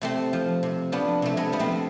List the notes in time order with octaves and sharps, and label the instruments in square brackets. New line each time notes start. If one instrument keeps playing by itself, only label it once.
[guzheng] C3 A3 C4
F3
C3
F3 B3 D4
C3 A3
G#3 B3
F3 B3
A3 C4